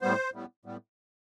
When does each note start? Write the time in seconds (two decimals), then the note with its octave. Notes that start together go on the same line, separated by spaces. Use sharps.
0.02 A2 G3 B3 C5
0.33 A2 G3 B3
0.65 A2 G3 B3